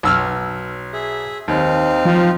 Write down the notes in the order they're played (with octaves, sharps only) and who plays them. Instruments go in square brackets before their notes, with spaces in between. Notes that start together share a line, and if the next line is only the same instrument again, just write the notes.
[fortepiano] B1 E6 F6
[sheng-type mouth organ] G#4 E5
[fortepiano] D#2 [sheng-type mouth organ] C4 D#4 F5
[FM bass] F3